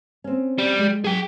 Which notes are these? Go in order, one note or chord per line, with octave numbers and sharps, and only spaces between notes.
C4 C#4
G3
G#3
F#3 G#4 G5